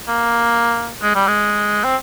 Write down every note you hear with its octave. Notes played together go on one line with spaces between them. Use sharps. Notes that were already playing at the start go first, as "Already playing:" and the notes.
A#3
G#3
G3
G#3
C4